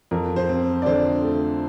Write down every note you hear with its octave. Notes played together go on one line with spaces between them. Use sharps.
F2 A#4
C5
C4
D5
D3 C5
A3